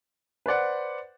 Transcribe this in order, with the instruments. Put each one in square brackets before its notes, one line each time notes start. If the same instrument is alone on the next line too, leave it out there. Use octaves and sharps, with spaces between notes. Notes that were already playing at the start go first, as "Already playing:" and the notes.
[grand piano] B4 C5 D5 F#5